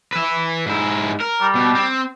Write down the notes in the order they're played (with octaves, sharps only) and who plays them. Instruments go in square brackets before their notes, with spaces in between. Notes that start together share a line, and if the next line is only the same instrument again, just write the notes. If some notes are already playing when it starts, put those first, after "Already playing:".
[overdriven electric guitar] B4 E5
G#2 E4
A#4
[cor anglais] G3
[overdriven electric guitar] B2
C4